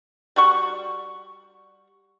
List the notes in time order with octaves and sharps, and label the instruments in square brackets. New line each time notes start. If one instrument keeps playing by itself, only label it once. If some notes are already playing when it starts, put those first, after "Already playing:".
[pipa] G3 F#4 C#6